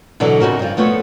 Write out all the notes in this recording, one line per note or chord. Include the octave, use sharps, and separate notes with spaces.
B2 D3 E3 F#3
F2 C#3 D#4 F#4 A#4
G2 F3
F3 A3 B3 A4 C#5